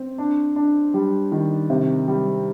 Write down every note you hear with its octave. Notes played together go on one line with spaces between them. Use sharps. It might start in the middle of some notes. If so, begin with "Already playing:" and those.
Already playing: C4
D4
D4
G3
D#3
C3
G3